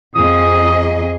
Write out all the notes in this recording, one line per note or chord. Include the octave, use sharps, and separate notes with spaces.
F2 G#4 D#5 D#6